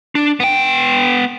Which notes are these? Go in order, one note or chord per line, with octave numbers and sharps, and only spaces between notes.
D4
B3 G5